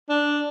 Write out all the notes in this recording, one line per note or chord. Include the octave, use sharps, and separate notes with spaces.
D4